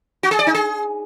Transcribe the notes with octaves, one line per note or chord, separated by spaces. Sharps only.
F#4
G#4
D5
D#4
G#4